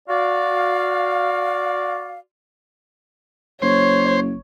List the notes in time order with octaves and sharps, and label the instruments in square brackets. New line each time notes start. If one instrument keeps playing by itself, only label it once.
[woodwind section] F#4 D5 F5
[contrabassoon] F#1 [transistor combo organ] C5 [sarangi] C#5